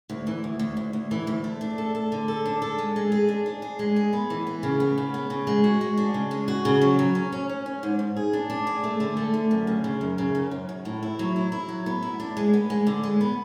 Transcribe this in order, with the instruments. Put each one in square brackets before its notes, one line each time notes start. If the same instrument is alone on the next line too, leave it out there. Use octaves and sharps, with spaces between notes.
[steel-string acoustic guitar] D2
E3
D2
D2
D2
D2
E3
D2
A3
D4
A4
A4
D3
A4
D4
A4
G#3
G#3
G#4
D4
D4
G#4
G#3
G#4
B3
E3
B3
C#3
B3
C#3
B3
C#3
G#3
F#4
G#3
D4
C#3
G#3
F#4
C#3
F#3
F#3
C#4
C#4
C#4
C#4
G#2
G#2
G#4
D4
D4
G#4
A3
D3
A3
D3
F#2
C#3
C#3
F#2
C#3
F#2
F#2
F#2
A2
E4
F#3
E4
E4
F#3
B3
E4
D4
G#3
B3
G#3
D3
G#3
B3